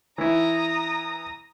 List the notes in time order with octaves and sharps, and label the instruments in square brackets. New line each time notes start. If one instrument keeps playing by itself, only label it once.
[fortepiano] E3 E4 [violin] A#5 D#6